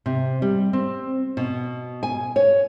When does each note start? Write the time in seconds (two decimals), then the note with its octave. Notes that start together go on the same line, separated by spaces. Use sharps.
0.06 C3
0.42 G3
0.73 C4
1.37 B2
2.03 G#5
2.36 C#5